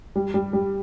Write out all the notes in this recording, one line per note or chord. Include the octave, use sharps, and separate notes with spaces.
G3
G3
G3